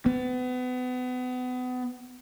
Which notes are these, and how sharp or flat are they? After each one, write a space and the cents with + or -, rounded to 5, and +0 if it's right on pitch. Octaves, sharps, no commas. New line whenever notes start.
B3 +30